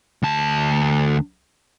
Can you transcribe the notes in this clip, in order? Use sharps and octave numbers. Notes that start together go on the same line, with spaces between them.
D2 A5